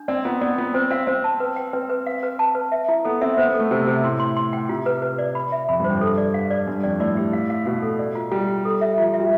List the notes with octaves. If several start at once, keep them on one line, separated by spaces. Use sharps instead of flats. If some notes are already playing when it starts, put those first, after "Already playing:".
Already playing: D4
C4 D5
B3 F4
B3 D5
B3 F4
C4 C5
C4 F5
C4 C5
A5
B4
G5
C4 B4
B4
F5
B4
A5
B4
E5
E4
B3 A4
C4 E5
B3 C5
B3
A4
A3
C3 C5
C3 C5
A2 C6
C6
C6
G5
C3 F4
B4
B4
D5
B5
E5
F2 B5
G2
C5
F2
G2 A4
D5
F5
D5
G2 D4
F2 D5
A2 D5
G4
F5
F5
B2 F5
A4
D5
F4
G3 F4
F4
A4
E5
F3 F4
F3
E5
G3